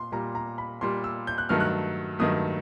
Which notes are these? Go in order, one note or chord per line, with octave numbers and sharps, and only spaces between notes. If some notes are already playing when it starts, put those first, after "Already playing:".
Already playing: A#2 C6
A#2 G3 A#5
A#5
B5
A#2 G3 C6
E6
G6
F#6
G2 D#3 F#3 A3 F6
F#6
G2 D#3 F#3 A3 D#6